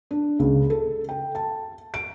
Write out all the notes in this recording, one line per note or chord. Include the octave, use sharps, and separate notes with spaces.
D4
C#2
A4
G5
A5
D7